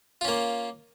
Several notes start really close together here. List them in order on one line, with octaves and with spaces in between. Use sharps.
F4 C#4 A#3